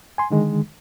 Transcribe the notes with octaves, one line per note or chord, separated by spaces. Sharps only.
G#5 C6
D3 D#3 G#3